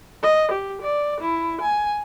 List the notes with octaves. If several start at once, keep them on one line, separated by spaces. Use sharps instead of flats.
D#5
G4
D5
E4
G#5